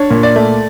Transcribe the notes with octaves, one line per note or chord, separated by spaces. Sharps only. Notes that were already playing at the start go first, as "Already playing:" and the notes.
Already playing: D4 C#5
A#2
D5
A3